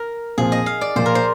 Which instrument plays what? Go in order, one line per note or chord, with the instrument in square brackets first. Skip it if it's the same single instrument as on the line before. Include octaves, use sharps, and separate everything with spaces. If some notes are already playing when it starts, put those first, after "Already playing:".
Already playing: [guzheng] A#4
[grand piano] A#2 F3 C4 F4 [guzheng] G#4
[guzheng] D#5
F5
D5
[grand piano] A#2 F3 A#3 [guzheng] C5
[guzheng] A#4
C5